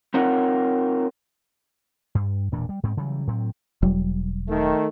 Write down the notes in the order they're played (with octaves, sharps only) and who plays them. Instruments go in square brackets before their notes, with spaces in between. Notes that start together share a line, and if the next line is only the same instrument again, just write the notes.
[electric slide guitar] C4 D#4 F4 A#4 C#5 F#5
[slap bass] G2
E1 A#2 E3 D4
G3
G#2 G#3 C4
C#3 E3 F#3 G3
A2 F#3 C4
[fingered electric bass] E1 F#3 G3
[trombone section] D#3 A3